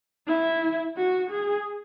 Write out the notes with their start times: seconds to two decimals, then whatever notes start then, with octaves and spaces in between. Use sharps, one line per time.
0.27 E4
0.96 F#4
1.30 G#4